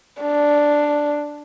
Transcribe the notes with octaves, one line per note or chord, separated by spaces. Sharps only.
D4